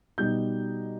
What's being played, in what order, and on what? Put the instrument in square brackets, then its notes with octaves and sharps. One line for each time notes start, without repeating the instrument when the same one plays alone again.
[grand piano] B2 G3 D#4 G6